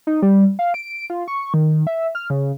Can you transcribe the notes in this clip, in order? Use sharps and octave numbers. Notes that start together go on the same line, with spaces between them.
D#4
G3
F5
D7
F4
C#6
D#3
E5
F6
C#3